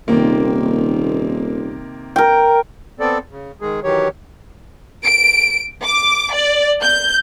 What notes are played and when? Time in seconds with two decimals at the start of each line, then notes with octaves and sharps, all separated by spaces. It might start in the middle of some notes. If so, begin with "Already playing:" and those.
0.08 D#1 C3 D#3 A#3
2.16 A#4 G5
3.00 B3 C4 A4 D5
3.30 C#3
3.61 D#3 G#3 G#4
3.84 D#3 E3 F#3 G4 C#5
5.04 D7
5.85 D6
6.33 D5
6.83 G6